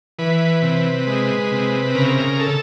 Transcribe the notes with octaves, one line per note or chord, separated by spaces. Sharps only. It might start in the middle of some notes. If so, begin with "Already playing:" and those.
E3 B4
C3
G#3
C3
C#3 A#4
A4